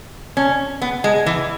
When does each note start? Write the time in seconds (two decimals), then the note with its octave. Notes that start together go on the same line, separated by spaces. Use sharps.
0.37 C#4
0.82 B3
1.04 G#3
1.26 E3